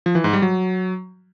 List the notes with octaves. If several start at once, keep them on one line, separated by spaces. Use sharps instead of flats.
F3
E3
G#2
G3
F#3